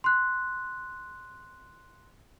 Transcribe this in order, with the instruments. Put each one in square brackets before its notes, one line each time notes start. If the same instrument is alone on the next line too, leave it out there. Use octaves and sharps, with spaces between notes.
[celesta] C6 F#6